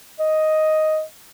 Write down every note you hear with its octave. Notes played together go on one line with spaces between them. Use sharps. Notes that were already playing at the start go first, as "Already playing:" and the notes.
D#5